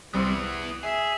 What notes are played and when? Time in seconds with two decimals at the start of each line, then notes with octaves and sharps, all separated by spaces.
0.14 C2 G3 B3 C4 E4
0.83 G#4 E5